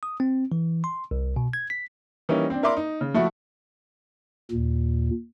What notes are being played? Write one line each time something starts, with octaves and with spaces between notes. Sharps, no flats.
D#6
C4
E3
C6
C2
B2
G#6
B6
E3 G3 A#3 C#4 D#4
C4 D4
E4 A#4 D5 E5 C6 D6
D#4
C#3
F3 A3 E4 F#4
D#2 A#2